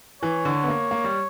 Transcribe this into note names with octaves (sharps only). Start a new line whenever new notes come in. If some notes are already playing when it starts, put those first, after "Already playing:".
E3 C#5
D3
B3
A#3
A#3
G3